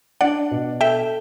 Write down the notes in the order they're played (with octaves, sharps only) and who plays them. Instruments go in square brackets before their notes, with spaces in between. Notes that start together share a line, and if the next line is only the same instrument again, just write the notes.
[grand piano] D4 [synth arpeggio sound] D5 F#5
[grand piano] B2
[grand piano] A4 [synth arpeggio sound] E5 G5